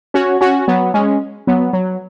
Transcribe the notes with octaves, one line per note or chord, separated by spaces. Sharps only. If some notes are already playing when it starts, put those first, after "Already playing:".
C#4 F#4
C#4 F#4
F#3 B3
G#3 C#4
F#3 B3
F#3